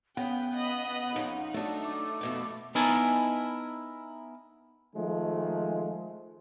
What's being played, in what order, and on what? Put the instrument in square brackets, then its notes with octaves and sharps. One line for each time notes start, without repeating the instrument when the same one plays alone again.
[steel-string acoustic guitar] C#3 [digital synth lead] B3 [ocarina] F#5 [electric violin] G5
[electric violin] D#5 B5
[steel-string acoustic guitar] F2 C#3 [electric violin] D#4
[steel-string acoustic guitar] F#3 D4 [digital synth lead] A3
[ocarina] D6
[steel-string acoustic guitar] F2 B2 B3
[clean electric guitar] B3 D#4 E4 A#4 G#5 A5
[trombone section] D#3 F3 G#3 A3